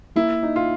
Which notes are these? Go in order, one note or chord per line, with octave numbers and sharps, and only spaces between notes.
A#3 E4
D#4
F4